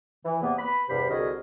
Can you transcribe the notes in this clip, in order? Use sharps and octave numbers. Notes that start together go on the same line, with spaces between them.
E3
E2 C3 A#3 B3
B4 B5
E2 G2 C3 G4 C5 B5
C2 D3 F#4 G#4 A#4 D#5